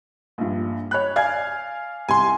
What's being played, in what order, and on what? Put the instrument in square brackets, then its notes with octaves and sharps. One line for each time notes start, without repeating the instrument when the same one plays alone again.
[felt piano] A#1 G2
C#5 B5 F#6
[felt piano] D5 G#5 G#6 [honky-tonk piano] F5
[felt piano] C2 [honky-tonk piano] G#5 C6